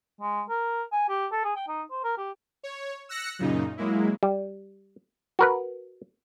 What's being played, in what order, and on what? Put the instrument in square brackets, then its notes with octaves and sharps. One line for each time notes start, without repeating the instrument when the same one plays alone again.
[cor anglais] G#3
A#4
G#5
G4
A4
G#4
G5
D#4
C5
A#4
G4
[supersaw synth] C#5
E6 F#6 A#6 C#7
F#2 A#2 C#3 D#4
F#3 G#3 A#3 E4
[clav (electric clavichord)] G3
F#4 A#4 B4